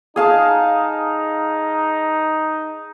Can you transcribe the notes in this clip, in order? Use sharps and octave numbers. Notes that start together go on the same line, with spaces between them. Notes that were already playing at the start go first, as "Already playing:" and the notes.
D#4 G#4 F5 A5